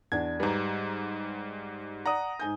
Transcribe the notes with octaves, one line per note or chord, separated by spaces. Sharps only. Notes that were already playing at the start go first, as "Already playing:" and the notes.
E2 D4 G#6
G#2 G3 B4 A#5
D5 F#5 A#5 D#6
G#2 G#5 G6